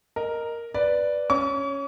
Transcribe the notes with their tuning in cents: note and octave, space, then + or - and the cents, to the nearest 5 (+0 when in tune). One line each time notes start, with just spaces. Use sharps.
A#4 +0 D#5 -10
B4 +0 D5 +0
C#4 +0 C#6 +45